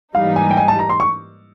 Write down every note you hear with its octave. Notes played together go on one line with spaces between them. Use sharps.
G#2 E3 G3 A#3 D#4 F5
G#5
G5
G#5
A5
A#5
C6
C#6